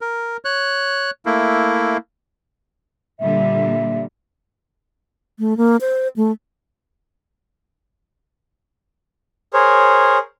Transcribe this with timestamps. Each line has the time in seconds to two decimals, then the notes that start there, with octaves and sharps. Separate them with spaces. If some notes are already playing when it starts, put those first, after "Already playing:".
0.01 A#4
0.45 C#5 F#6
1.26 A3 A#3 E4
3.20 A#2 D3 G3 E5
5.39 A3
5.57 A#3
5.81 C5
6.16 A3
9.54 G#4 A#4 C5 C#5